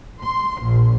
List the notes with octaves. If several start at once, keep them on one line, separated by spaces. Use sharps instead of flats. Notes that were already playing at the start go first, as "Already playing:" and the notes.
C6
A#1